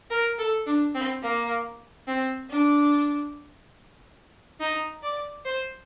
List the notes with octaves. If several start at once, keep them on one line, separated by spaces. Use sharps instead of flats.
A#4
A4
D4
C4
A#3
C4
D4
D#4
D5
C5